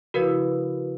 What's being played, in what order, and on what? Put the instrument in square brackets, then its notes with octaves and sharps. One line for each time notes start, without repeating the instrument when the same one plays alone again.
[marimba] C#3 F3 E4 [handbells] F#4 A#4 B4